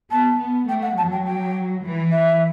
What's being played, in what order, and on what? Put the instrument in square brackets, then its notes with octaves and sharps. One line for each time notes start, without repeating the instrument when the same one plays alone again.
[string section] B3 [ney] A5
[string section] B3
[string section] A3 [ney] G5
[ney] F#5
[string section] F#3 [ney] A5
[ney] G5
G5
[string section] E3
[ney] E5